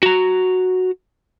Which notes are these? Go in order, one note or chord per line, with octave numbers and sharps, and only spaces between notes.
F#4 A#5